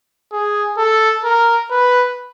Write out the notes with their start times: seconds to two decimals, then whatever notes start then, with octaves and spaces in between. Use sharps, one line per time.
0.32 G#4
0.78 A4
1.24 A#4
1.71 B4